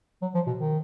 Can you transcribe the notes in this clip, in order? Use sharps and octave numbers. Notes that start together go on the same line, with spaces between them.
F#3
F3
B2
D#3